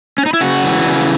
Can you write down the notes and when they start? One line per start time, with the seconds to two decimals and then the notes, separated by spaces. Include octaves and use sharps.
0.18 C#4
0.26 D#4
0.33 E4
0.41 C#3 F#4
0.64 E3
0.86 C#3